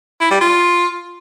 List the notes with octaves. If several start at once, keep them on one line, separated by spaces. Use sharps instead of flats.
E4
G3
F4